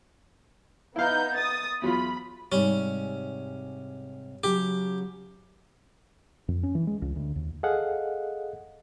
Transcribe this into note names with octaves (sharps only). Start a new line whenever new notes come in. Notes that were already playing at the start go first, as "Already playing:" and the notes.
B3 D#4 E4 F5 G6
D#6 A6
E2 F#3 F4 B5
G#2 C3 G3 C#4
C#3 F#3 G4
F2
C#4
E3
G#3
C#2
D2
D#2
G#4 A4 D#5 F5 F#5